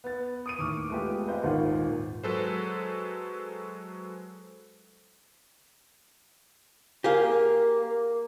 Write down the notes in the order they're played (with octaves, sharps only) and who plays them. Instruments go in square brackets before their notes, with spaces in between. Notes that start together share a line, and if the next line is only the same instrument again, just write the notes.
[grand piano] B3 A6
D#6 D7 D#7
D#2 A2 C#6 D6 F6
G#3 A3 B3 F4 G4
B3 C4 C5 D#5 F5
D#1 G#1 G#2 F4 F#5
[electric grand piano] F#3 G#3 A4 B4 C5
[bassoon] A#3 [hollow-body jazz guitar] G4 G#4 F5
[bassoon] A#3
A#3